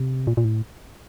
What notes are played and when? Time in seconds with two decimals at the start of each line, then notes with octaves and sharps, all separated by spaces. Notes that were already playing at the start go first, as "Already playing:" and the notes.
Already playing: C3
0.27 A#2
0.37 A#2
0.44 A2